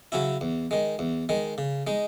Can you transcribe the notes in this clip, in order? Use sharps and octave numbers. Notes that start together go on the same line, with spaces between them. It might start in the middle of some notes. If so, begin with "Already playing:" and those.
C#3 F#3 C#4 E4
E2
D#3 G#3
E2
D#3 G#3
C#3
G#3 D#4